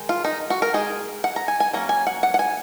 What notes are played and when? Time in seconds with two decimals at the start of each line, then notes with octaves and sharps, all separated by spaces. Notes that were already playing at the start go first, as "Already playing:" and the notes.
Already playing: D#3 G#3
0.09 F4
0.25 D#4
0.50 F#4
0.62 A#4
0.74 G#3 D#4 G#4
1.24 F#5
1.36 A#5
1.48 G#5
1.60 G#5
1.73 F#3 A#3 C#4 A#5
1.89 G#5
2.07 F#5
2.23 F#5
2.34 F#5
2.39 G#5